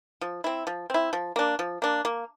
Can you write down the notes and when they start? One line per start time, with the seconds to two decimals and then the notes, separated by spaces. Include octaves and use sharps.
0.21 F3
0.44 C4 E4
0.67 F3
0.90 C4 E4
1.13 F3
1.36 A#3 D4
1.59 F3
1.82 A#3 D4
2.05 A#3